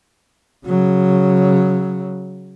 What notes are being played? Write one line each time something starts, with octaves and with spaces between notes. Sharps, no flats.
C#3 F#3